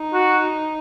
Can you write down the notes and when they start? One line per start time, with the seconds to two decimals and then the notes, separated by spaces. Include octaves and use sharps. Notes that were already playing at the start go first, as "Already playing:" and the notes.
Already playing: D#4
0.14 F#4